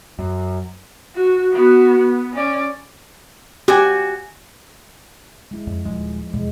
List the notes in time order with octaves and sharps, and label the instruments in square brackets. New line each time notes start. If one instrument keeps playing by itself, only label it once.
[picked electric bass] F#2
[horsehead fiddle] F#4
B3 F#4
B3
C#4 D5
[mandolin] F#4 G#5 [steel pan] G4
[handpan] G#3 E4
[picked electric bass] F2
[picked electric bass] D#1 G#3 [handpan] F3
[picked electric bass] E2 [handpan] B2 G#3